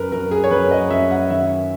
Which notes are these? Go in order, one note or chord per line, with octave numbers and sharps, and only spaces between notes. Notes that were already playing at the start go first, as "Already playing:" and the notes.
Already playing: F#2 A#4 B4
F#2 A#4
G#4
C#5
F#2 B4
D#5
F#2 E5
F#5
D#3 E5